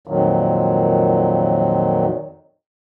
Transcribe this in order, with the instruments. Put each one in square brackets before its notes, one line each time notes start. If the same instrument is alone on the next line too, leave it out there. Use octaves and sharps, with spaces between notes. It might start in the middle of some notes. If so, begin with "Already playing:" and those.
[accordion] F2 A#2 D#3 F#3